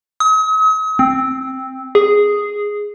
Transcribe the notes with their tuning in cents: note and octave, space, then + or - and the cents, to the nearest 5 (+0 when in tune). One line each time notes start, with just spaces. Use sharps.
D#6 +45
C4 +5
G#4 -5